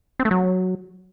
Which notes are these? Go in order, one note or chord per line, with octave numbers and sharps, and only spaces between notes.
C4
A3
F#3